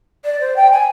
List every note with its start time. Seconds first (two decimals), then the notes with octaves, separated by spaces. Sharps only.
0.25 D5
0.41 C5
0.56 G5
0.72 G#5